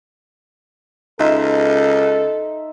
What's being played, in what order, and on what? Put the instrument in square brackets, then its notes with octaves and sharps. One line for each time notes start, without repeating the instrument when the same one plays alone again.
[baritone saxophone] C#2 [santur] D#4 E5 C6 [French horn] A4